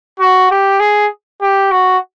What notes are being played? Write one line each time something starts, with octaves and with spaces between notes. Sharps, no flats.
F#4
G4
G#4
G4
F#4